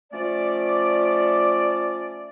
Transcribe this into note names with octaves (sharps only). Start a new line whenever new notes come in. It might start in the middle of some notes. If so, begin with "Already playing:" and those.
F3 A3 C#4 D5